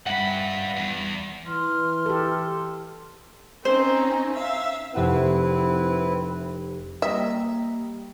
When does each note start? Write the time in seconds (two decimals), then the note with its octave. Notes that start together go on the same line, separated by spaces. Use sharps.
0.07 G2 G3 E5 F#5 B5
0.77 E2
1.46 E3 C6 F6
2.06 G4 A4
3.65 C4 C#4 D#4 C5
4.32 E5 F5
4.94 F1 C4 E4 B4 F#5 E7
7.02 G3 A#3 D#5 E5 G5